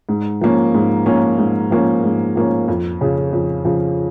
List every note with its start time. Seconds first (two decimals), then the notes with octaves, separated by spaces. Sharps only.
0.09 G#2
0.41 F3 A#3 C#4
0.74 G#2
1.06 F3 A#3 C#4
1.38 G#2
1.71 F3 A#3 C#4
2.04 G#2
2.35 F3 A#3 C#4
2.68 F2
3.01 C#3 F3
3.33 F2
3.65 C#3 F3